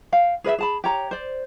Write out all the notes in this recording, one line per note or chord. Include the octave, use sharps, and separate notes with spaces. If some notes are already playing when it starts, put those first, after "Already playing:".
F5 G5
G#4 B4 D#5 E5
G#4 A5 B5
G4 C#5 A#5
C5 D5